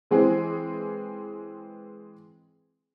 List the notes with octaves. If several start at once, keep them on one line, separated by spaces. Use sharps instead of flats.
E3 G#3 C4 G#4